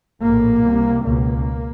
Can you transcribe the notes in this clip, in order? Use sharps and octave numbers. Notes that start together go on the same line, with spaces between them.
A#1 A2 A#3
C2 C3
C#2 B2 A#3